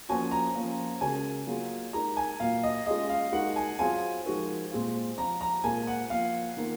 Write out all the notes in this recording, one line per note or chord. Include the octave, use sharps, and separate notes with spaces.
F3 A#3 C#4 F#4 G#5
A#5
F3 A#3 C#4 F4
C#3 G#3 C#4 F#4 A#4 G#5
F#3 A#3 F4 G#4
G#3 D#4 A#4 A#5
G#5
A#2 F#3 A#3 F5
D#5
G#3 C#4 F4 G#4 D#5
F5
G#3 D#4 F#4 A#4 F#5
G#5
F#3 C4 F4 G#4 G#5
F3 G#3 D#4 F#4 A#4
A#2 G#3 C4 F4
F3 C4 F4 A#5
A#5
A#2 G#3 C4 F4 A#4 G#5
F#5
F3 A#3 F4 F5
D#3 A#3 F4 A#4